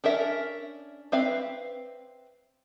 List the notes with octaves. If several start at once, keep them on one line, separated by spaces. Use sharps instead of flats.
C#4 D4 A#4 E5
C4 B4 E5 F5